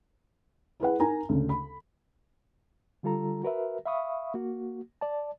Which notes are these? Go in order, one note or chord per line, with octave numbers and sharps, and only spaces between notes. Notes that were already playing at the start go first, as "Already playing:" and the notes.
E4 G#4 B4 F#5
D#4 A#4 G#5 A#5
D2 C#3
B5
D3 G3 F4 A4 A#5
F#4 A#4 B4 E5
E5 F5 B5 C#6 D#6
A#3 F#4
D5 A5